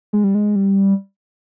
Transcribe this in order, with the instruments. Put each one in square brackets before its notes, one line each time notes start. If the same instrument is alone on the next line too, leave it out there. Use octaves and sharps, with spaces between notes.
[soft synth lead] G#3
G3
G#3
G3